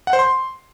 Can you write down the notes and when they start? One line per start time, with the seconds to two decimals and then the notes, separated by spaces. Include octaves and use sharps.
0.07 F#5
0.13 C5
0.19 C6